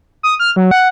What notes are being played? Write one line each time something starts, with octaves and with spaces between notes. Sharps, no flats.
D#6
F6
F#3
F#5